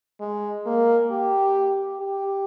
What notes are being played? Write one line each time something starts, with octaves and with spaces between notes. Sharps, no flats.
G#3
A#3
G4
G4